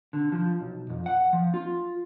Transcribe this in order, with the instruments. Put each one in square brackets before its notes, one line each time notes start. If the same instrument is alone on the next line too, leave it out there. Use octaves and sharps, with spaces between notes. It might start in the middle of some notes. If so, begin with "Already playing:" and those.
[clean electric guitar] D3
F3
B1
F2
F#5
F3
F4